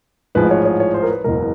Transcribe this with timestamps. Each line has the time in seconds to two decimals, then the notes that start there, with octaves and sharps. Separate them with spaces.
0.35 A1 G#2 F3 G#3 B4
0.51 C#5
0.65 C#5
0.80 C#5
0.94 C5
1.03 A#4
1.10 B4
1.24 F#1 E2 B2 G#3 A#4